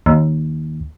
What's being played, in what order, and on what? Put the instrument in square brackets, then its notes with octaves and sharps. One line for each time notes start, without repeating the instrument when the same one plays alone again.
[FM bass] D#2